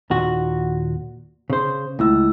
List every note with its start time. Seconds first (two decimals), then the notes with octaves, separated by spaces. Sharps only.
0.10 D#2 A#2 F#4
1.50 C#3 C5
1.99 C#2 A3 E4 E6